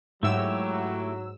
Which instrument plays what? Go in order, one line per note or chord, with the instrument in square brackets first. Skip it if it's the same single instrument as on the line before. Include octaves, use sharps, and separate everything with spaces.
[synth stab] G#2 E6 [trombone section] F#3 [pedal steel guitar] A3 E4 G4